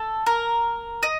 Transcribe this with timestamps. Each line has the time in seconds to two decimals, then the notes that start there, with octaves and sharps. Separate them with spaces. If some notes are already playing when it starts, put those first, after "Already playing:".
Already playing: A4
0.26 A#4
1.03 D#5